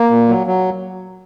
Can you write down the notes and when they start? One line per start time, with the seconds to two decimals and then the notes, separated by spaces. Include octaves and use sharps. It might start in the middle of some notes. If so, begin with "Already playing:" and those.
Already playing: A#3
0.10 A#2
0.29 F#3
0.47 F#3